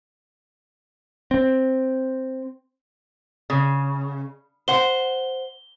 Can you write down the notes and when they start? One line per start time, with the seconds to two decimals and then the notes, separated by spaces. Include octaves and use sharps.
1.31 C4
3.50 C#3
4.68 C5 F#5 G7